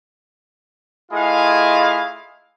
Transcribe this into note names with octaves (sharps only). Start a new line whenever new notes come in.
A3 E4 F4 G#4 D#5 F5